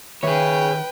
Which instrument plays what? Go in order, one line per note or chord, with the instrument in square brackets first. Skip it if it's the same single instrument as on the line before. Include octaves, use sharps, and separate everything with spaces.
[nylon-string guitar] D#3 E5 [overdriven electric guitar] G#4 C#5 [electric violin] B4 G5